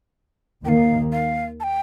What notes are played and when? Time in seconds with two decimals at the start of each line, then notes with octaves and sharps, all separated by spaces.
0.65 D#2 D#3 A#3 F5 G5
1.12 F5
1.60 A5
1.64 G5